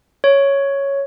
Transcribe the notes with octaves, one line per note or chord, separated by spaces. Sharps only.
C#5